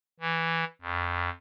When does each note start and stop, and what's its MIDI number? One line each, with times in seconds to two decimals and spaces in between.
0.20 0.64 52
0.81 1.30 41